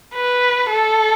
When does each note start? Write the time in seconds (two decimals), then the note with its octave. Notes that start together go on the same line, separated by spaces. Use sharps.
0.15 B4
0.70 A4